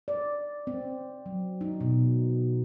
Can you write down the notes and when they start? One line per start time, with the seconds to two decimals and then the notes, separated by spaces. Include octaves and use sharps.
0.08 D5
0.67 C4
1.26 F#3
1.61 D#4
1.81 B2